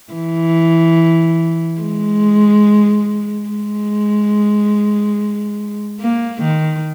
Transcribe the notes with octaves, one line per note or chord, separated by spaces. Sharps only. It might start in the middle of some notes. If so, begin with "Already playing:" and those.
E3
G#3
G#3
A#3
D#3